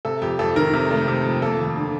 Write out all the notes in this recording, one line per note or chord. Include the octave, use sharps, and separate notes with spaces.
C3 A4
F2 G4
F2 A4
D#3 A#4
C3
A3
C3
F2
A#3 A4
D#2
D3